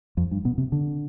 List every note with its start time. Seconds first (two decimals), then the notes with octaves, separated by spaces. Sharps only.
0.17 F2
0.31 G2
0.45 B2
0.58 C3
0.72 D3